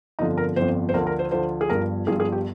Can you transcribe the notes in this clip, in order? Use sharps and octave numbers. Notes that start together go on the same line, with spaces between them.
G1 F2 D3 F3 D#4
A#4
G1 F2 D3 F3 C5
C5
D2 D3 F3 A#4
A#4
C5
D2 D3 F3 C5
G#4
G1 G2 F3 A#4
G1 G2 F3 G#4
G#4
G4